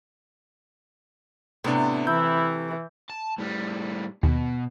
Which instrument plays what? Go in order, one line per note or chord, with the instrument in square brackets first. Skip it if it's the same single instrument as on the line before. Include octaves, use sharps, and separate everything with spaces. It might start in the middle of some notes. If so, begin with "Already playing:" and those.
[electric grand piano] A2 B3 D4 [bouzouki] C3 A3
[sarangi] E3 [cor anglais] E4 [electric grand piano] G6
[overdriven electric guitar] A5
A2 G3
[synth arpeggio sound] D#2 [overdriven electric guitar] B2